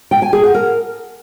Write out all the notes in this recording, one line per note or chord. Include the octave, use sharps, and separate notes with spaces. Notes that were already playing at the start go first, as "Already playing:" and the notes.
G5
G#5
G#4
F#5
A#4